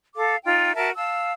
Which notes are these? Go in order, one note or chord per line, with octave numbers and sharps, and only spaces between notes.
A4 F5 D6
D#4 F4 G5
F#4 A#4 E5 A5
F5 A5 E6